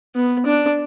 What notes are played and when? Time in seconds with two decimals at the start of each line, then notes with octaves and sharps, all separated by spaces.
0.16 B3
0.46 D4